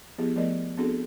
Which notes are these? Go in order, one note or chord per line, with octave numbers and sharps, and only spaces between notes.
F3 B3 E4 G4 G#4
F3 A3 B3 A#4 D5 D#5
B3 C4 D4 F#4 G#4 A4